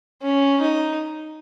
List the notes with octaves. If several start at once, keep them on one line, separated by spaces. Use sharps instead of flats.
C#4
D#4